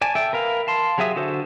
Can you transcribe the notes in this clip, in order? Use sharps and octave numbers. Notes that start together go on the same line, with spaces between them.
D5 G#5 A5
A4 E5 G5
A#4 B4 F5
F5 A5 C6
F#3 G4 G#4 E5 D#6
D3 F#4 A4 C5